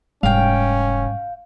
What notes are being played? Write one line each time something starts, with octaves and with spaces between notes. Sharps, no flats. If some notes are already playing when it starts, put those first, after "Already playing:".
F1 G#2 G3 C#4 F5 G5